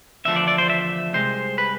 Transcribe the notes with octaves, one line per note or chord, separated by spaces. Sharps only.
E2 D3 F3 A3 E5
D5
D5
C5
E5
C2 C3 G#3 C5
B4